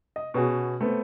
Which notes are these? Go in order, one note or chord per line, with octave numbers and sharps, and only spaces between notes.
D#5
B2 B3 C#4 F#4 G#4
A3 B3 C4